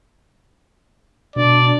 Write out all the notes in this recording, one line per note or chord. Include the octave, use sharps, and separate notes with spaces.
B2 D4 D5